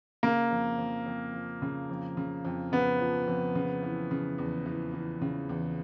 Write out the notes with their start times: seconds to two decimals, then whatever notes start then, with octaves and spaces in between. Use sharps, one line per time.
0.23 C#3 A#3
0.51 F2
0.78 F2
1.06 F2
1.34 F3
1.62 C#3
1.89 F2
2.17 C#3
2.45 F2
2.72 C#3 B3
3.00 F3
3.28 F2
3.55 C#3
3.83 E3
4.11 C#3
4.38 E2
4.66 E3
4.93 E3
5.21 C#3
5.49 E2